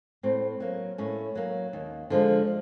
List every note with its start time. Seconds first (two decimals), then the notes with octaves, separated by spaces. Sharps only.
0.23 A2 C4
0.60 F#3 A#3
0.98 A2 C#4
1.35 F#3 A#3
1.73 D#2
2.10 D3 F3 G#3